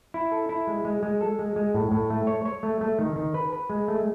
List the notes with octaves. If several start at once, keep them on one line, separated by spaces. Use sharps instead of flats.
E4
A4
E4
G#3
G#3
G#3
A4
G#3
G#3
A2
A2
A3
C#5
C#5
A3
A3
D#3
D#3
B4
B4
G#3
A3